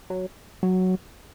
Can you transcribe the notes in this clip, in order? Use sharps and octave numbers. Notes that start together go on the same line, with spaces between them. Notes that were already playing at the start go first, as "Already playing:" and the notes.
F#3
F#3